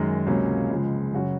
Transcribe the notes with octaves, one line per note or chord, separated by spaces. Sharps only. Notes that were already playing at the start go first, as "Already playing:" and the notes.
Already playing: F#2 D#3 G#3 D#4
C#2 C3 F#3 A#3 C#4
C#2 C#3 F3 G#3
F#2 C#3 F#3 C#4 F#4